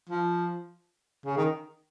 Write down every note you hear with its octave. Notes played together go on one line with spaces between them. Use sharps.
F3
C#3
D#3